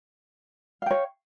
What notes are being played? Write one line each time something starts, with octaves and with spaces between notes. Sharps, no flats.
C#5 F5 G5